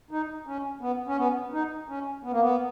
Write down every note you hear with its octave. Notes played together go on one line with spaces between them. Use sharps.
D#4
C#4
B3
C#4
B3
D#4
C#4
B3
A#3
B3